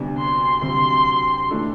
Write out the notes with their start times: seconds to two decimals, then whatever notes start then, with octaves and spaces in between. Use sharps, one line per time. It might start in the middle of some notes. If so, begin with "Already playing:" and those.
Already playing: D2 C3 G3 B3 D4
0.18 C6
0.61 D2 C3 F#3 C4 F#4 C6
1.50 E3 A3 D4 A4